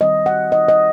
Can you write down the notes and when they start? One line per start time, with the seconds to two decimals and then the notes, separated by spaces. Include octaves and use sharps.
0.01 D#3 G3 C4 D#5
0.26 F#5
0.52 D#5
0.68 D#5